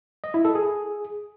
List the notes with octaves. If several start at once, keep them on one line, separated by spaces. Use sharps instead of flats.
D#5
E4
A4
G#4